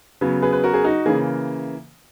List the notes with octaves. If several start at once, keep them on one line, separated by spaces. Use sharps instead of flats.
C#3 F#3 B3
G#4 B4
B4
F#4 A#4
G#4
D#4 F#4
C#3 E3 A#3 G#4